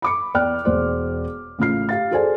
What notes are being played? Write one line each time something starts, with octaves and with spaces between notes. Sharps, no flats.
B5 D6 C#7
E2 D5 G5 F6 F#6
E1 C5 D5
A1 C#3 F4 F6 C7
G4 F5 A6
F#4 G#4 A4 C5 D5 G#5